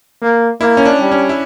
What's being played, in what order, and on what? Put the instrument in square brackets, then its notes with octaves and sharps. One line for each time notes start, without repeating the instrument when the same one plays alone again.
[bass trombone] A#3
[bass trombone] A#3 [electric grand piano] E4
[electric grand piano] C#4
D4
[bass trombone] G3
[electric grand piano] C#4
E4